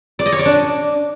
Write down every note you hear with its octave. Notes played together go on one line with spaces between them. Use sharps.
D5
D#5
C#5
D5
D4